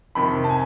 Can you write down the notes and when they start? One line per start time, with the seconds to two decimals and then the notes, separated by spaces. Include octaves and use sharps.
0.15 F2 C3 D#3 B5
0.44 A5
0.49 G#5